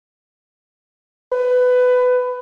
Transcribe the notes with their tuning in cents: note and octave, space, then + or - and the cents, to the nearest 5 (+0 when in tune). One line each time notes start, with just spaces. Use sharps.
B4 +20